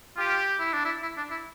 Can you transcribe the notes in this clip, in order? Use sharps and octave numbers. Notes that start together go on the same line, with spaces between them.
F4 G4
E4
D4
E4
E4
D4
E4